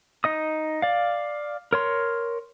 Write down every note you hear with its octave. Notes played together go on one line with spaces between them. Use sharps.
D#4 D#5 D#6
D5 F5
A#4 C#5 C6